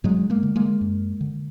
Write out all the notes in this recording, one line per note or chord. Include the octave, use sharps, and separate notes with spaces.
G2 F#3 G#3
G#3 A#3
D3
G#3 A#3
F#2
D3